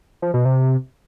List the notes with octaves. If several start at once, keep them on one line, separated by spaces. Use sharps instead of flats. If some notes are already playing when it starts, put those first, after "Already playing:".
F3
B2
C3